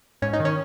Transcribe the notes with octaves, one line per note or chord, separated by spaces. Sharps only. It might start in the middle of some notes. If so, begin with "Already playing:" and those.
G#2 C#4
D#4
D#3
C#4